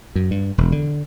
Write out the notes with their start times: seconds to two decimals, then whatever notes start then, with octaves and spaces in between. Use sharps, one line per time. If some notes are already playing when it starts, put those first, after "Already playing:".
0.15 F#2
0.31 G2
0.58 E1
0.72 D3